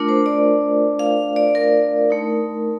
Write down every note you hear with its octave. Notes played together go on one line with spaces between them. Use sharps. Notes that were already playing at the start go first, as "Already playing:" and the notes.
Already playing: A3 D4 F4 A#4
C5
D5
F5
D5
A#4
A3 D#4